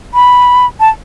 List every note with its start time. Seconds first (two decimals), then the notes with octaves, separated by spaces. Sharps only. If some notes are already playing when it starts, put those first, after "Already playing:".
0.14 B5
0.80 A5